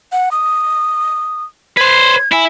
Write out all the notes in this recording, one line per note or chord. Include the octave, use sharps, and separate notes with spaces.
F#5
D#6
B4 C5 G#6
E4 G#5